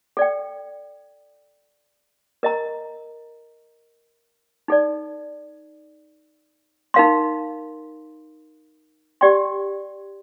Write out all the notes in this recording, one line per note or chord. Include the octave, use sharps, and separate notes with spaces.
A4 D5 G5
A#4 D#5 A#5
D#4 A4 D5
D#4 A#4 F5 C6
G4 D5 G5 C6